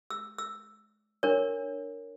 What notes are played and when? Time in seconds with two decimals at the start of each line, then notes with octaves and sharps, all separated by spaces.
0.10 E6
0.38 E6
1.23 D4 A#4 C#5